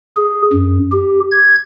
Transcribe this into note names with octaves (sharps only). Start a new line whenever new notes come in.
G#4
F#2
G4
G#6